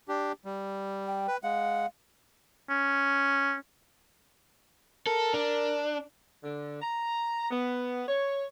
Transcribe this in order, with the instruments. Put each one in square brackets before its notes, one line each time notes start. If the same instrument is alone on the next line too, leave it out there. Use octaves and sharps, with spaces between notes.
[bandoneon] D4 G4
G3
[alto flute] G5
[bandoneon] B4
[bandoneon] G#3 F#5 [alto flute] F5
[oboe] C#4
[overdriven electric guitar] A4 [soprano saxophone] A#4
[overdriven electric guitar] D4
[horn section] D3
A#5
B3
C#5